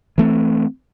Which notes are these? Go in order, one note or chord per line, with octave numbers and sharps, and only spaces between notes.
E3 A3 C4